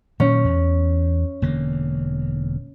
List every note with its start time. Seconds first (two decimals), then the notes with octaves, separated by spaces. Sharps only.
0.20 A#2 D#3 F#3 C#4
0.44 E2
1.42 E1 D3 A#3